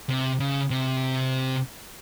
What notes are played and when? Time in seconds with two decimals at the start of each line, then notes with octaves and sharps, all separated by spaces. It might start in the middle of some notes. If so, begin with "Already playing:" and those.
0.09 C3
0.40 C#3
0.70 C3